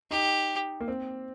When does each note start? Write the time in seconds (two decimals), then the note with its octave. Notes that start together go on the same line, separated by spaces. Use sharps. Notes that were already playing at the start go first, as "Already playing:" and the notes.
0.11 D#4 G4
0.80 A#3
0.88 C4